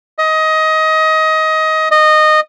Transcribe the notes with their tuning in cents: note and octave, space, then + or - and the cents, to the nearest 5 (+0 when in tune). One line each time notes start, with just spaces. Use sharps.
D#5 +20
D#5 -15